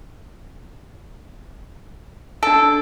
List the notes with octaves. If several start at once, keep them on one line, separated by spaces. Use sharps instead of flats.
D4 A4 D7